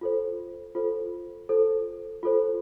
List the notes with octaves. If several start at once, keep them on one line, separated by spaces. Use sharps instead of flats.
F4 A4 C5
F4 A4 C5
F4 A4 C5
F4 A4 C5